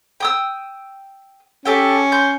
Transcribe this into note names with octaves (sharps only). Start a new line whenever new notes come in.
G5 D#6 E6
C#4 G4 A4 G5
C6 G6